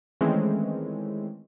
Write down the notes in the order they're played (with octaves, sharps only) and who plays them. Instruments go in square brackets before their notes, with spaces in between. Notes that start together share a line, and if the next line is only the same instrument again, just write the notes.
[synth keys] D#3 E3 G#3 A3 C4 C#4